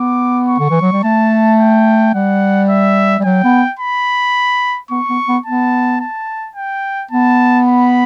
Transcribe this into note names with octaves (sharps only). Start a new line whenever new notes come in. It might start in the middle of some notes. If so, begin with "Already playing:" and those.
Already playing: B3 D6
C#6
D3
E3
F#3
G3
A3 A5
G5
G3 F#5
E5
G3
F#3 G5
B3
B5
B3 C#6
B3
B3
B3 A5
A5
G5
B3 A5
B5